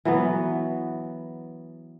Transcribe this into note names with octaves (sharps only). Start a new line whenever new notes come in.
E3 F#3 B3